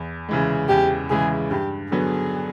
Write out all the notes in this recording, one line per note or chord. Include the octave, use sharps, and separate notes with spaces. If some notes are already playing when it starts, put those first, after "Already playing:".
Already playing: E2
C#3 E3 G#3
E2 G4
C#3 E3 G#3 G#4
G2 G4
D3 F#3 B3 G#4